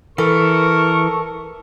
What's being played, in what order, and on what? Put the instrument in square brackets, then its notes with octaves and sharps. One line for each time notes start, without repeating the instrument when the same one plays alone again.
[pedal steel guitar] E3 [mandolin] A4 [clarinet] A#4 [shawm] C#6